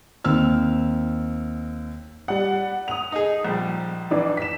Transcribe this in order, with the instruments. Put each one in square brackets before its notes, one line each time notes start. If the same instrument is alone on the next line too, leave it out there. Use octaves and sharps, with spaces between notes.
[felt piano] D#2 C4 E6 F6
[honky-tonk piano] G3 F#5
D#6 F7
[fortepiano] D#4 G#4
A#1 G3
[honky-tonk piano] E3 D4 D#4
B6 E7